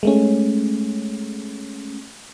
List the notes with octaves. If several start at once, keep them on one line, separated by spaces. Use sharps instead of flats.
G#3 A3 C#4